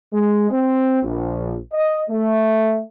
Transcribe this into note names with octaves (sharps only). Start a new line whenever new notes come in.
G#3
C4
A#1
D#5
A3